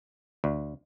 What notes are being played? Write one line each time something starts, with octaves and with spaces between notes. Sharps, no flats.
D2